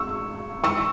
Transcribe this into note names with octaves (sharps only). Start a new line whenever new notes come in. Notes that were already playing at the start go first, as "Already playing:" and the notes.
Already playing: C#6 E6
C#6 E6